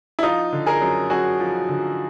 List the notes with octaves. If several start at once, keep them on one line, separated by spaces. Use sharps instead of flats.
E4
F3 D#4 F4
D3
G#4 A#4
F#2
F#2 F#4 G#4
F3
D3